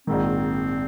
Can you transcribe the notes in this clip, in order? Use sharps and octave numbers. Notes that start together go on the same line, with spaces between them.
A#1 G#2 D#3 C4